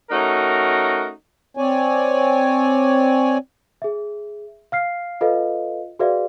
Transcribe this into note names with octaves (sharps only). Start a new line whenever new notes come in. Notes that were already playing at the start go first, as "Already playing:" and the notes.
A3 C#4 D#4 F#4 A#4
C4 C#5 D5 G#5
G#4 E5
F5 F6 C7
F4 A4 B4 D#5 F5
F#4 G#4 B4 D5 E5 F5